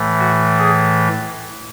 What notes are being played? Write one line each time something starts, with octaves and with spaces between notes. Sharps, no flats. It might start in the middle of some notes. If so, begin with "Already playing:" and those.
Already playing: A2 E3 A3
F#4
G#4